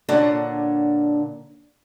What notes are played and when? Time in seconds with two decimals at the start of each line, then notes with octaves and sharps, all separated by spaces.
0.09 A#2 D3 D4 C#5 F#5